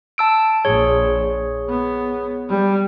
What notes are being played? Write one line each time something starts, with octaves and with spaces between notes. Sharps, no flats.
A5 E6 D7
A#1 G#4 C#5
B3
G3